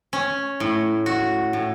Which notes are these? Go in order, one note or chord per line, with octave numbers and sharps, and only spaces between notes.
C#4
A2
F#4
A2